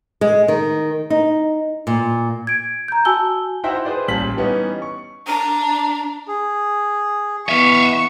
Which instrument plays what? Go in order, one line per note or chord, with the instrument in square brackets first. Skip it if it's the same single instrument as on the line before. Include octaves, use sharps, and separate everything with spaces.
[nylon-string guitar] G#3
D#3
D#4
A#2
[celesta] G#6 D7
A#5 G6
F#4 G#5 A5 E6 G7
[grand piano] D#4 E4 F#4 C5 E5 G5
G#4 B4 C5 D5
A1 A#2 G3 A5 B6 F#7
E3 G3 B3 C#4 D#4
C#6
[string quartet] D4 [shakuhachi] A#5
[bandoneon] G#4
[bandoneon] E3 [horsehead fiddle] B3 [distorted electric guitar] E5 F5 [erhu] C#6